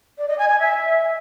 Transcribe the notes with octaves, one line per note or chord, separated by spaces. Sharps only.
D5
D#5
G#5
G#5
E5